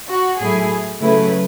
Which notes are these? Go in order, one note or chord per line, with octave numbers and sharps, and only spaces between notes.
F#4
A2 F#3 A3 E4 G#4
C#3 F#3 A3 E4 B4